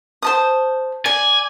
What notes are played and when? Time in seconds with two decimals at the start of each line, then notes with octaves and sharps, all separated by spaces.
0.22 C5 A5 D#6
1.06 D5 G#5